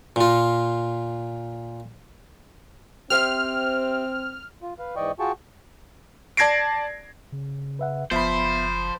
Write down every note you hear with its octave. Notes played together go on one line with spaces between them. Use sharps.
A#2 F4
C4 G4 C5 E5 F6
F4
B4 F5
G#2 E3 D5 D#5 G5 C#6
F4 F#4 G#4 G5 A5 C#6
D5 A5 G#6 A#6 C7 D7
C#3
B4 E5 F#5
F#1 F3 B3 C5 E5 B5